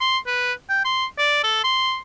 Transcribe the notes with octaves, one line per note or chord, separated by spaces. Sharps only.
C6
B4
G5
C6
D5
A4
C6